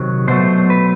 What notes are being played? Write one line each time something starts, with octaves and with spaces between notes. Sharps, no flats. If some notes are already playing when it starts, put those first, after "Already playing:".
Already playing: C3 D#3 F#3
B2 F#3 A3 C5
B4